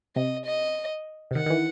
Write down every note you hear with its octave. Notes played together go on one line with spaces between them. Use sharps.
C3 D#5
D#5
C3
D#3 F#5
D#3
E3